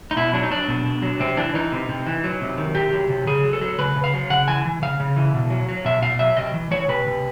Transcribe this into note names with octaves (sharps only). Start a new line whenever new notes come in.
D#4
B2 E4
F#3 D4
D#4
F#3 D4
B2
B2
F#3
C3 C4
E3 D4
E3 D#4
C3
C3
E3
F#3
C3
D#3
C3 G4
F#3
C3
C#3 G#4
F#3
A4
F#3
C#3 B4
C#3
F5
F#3
C#3 F#5
E3 G#5
E3
C#3 F5
C#3
E3
B2
F#3
F#3
B2 E5
B2 F5
F#3 E5
C3 D#5
E3
E3 C#5
C3 B4
C3